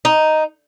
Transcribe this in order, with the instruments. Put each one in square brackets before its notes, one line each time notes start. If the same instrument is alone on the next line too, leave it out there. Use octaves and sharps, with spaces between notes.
[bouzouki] D#4